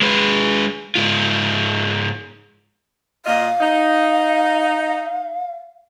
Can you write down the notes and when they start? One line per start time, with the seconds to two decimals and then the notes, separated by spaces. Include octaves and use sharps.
0.02 G#3 B4
0.95 G#2 F4
3.26 A#2 F4 D#5 F5
3.61 D#4